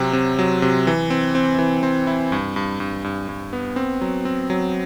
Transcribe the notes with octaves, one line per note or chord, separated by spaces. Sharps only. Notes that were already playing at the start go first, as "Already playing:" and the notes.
Already playing: C3 F#3 C4
C3
F#3
C3
E3
C4
C4
E3
C4
E4
G2
G2
G2
G2
G2
B3
C4
F#3
C4
F#3